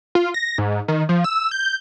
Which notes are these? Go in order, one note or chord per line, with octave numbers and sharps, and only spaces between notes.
F4
A#6
G#2
D#3
F3
E6
G6